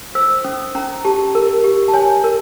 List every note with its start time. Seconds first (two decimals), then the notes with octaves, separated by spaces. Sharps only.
0.15 C5 E6
0.44 C#4 D#6
0.75 C#4 A#5
1.04 G4 A5
1.35 A#4
1.64 G4
1.88 A5
1.94 C#5 G#5
2.24 A#4